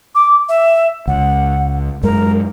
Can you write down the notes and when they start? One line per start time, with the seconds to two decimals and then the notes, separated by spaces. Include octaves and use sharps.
0.15 D6
0.49 E5
1.07 C#2 F#5
2.03 F#2 G#3 A#4